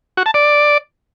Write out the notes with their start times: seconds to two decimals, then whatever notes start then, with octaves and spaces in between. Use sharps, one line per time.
0.17 F#4
0.26 A5
0.34 D5